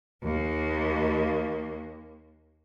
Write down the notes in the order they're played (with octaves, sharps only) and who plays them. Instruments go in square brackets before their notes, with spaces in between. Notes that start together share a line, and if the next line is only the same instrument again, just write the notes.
[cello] D#2 A#3